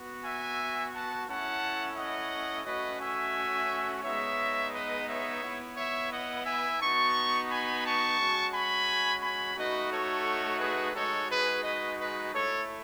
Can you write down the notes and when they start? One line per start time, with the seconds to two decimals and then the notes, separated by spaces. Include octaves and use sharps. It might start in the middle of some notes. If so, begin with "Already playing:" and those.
Already playing: B3 F#4
0.24 E5 G#5
0.93 F#5 A5
1.27 A3 C#4 E4 F#5 A5
1.96 D#5 F#5
2.65 A3 C#4 F#4 B4 D#5
3.00 E5 G#5
4.03 G#3 B3 D#4 C#5 E5
4.72 B4 D#5
5.08 C#5 E5
5.42 B3 E4
5.76 C#5 E5
6.11 D#5 F#5
6.45 E5 G#5
6.80 B3 D#4 F#4 A5 C#6
7.49 G#5 B5
7.84 A5 C#6
8.19 G#3 C#4 F#4
8.53 G#5 B5
9.22 G#5 B5
9.56 A3 D#4 F#4 B4 D#5
9.91 A4 C#5
10.60 G#4 B4
10.94 G#3 D#4 F#4 A4 C#5
11.30 G#4 B4
11.63 B4 D#5
11.99 B4 D#5
12.33 A3 E4 A4 C#5